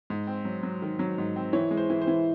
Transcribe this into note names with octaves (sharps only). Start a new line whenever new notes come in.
G#2
C4
F#3
F#3
D#3
F#3
G#2
C4
E3 C#5
G#3
C5
E3
C5
E3